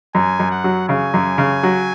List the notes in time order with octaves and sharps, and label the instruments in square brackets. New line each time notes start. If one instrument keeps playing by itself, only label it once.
[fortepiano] F#2 [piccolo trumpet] G#5
[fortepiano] F#2
[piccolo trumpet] F#5
[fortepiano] F#3
[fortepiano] C#3 [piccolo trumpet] G#5
[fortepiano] F#2
C#3
F#3